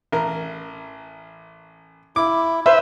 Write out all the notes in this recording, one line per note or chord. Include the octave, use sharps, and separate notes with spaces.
A1 A#4
E4 D6
B4 C5 E5